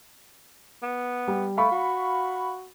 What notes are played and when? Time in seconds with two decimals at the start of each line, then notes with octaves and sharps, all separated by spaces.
0.83 B3
1.28 G3
1.58 A3 F5 B5 C#6
1.71 F#4